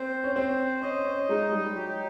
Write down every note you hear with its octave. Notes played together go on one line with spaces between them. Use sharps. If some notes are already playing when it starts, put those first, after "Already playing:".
Already playing: C4 C5
C#4
C4 C5
C#4 D#5
C#4
G#3 D#4
G3
F#3 G4